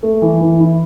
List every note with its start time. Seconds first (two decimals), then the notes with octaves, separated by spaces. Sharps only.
0.03 A3
0.22 E3
0.41 E3
0.60 E4